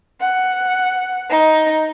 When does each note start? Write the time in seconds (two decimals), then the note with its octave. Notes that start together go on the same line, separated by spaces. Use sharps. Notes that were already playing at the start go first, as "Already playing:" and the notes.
0.20 F#5
1.31 D#4